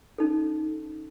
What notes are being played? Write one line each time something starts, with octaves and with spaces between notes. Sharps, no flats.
C#4 D#4 A4